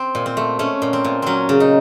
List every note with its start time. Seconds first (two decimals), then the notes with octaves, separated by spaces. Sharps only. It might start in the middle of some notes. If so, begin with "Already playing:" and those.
Already playing: C4
0.15 A#2
0.26 C4
0.37 A3
0.59 A3 C#4
0.82 A#2
0.93 C4
1.05 A#2
1.22 F#3 C4 C#4
1.49 C#3
1.60 D#4